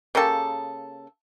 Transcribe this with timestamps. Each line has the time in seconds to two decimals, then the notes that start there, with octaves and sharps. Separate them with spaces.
0.15 C#3 A#3 G4 A4